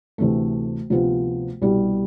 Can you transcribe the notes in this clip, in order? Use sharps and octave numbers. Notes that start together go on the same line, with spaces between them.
D2 C3 E3 A3
D2 C3 F3 B3 F4
C2 B2 G3